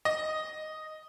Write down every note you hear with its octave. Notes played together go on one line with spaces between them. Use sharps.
D#5